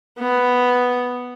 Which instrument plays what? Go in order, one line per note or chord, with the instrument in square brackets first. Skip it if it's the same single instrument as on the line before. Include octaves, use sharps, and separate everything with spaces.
[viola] B3